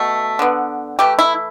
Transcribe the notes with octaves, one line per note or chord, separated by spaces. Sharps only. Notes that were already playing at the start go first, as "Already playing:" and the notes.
Already playing: B2 A3
D3 B3
E3 A3 G4
E4